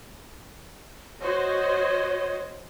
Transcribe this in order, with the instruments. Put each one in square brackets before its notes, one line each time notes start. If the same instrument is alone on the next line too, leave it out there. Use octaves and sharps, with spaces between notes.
[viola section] F#4 C5 D#5 [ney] C#5